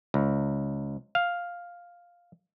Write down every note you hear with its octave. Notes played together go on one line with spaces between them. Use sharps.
C#2
F5